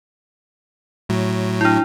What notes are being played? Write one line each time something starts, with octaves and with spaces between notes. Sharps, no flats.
A2 F#3
D4 E4